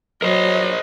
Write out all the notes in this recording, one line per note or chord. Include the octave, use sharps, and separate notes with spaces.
F#3 A#4 C5 D#5